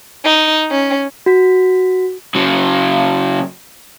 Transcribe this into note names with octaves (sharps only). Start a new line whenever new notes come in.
D#4
C#4
F#4 B6
C#3 F#3